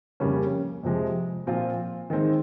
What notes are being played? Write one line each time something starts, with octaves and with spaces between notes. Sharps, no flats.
F2 C#3 G3 A#3 C#4
F2 C3 F3 G#3
A#2 F3 C4 F4
D#3 G#3 C4 D#4